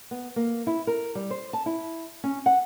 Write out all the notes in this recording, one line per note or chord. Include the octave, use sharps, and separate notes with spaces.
B3
A#3
E4
A#4
G3
C5
A5
E4
C#4
F#5